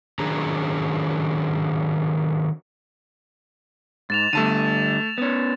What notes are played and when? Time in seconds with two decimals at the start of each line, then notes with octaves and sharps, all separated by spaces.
0.19 D#3 F#3 D4 G#4 A#5
4.10 G#2 A6 E7 F7
4.33 D3 G3 A3 A5 D#7
5.18 B3 C#4